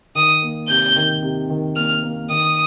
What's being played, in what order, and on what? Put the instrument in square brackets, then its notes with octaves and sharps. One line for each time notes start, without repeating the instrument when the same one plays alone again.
[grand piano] D#3 [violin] D#6
[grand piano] A#3
[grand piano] C3 [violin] G6
[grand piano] D#3
C3
D#3
[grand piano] A#3 [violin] F6
[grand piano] A#3
[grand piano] D#3 [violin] D#6